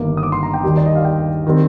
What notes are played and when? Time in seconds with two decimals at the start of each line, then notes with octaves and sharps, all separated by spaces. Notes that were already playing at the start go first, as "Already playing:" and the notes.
Already playing: G1 G2 D#3 A#3 D6
0.17 D#6
0.23 D6
0.32 C6
0.43 A#5
0.54 G5
0.63 D#2 D#3 G3 D4
0.77 D5
0.86 D#5
0.95 F5
1.05 G5
1.46 D#3 G3 C4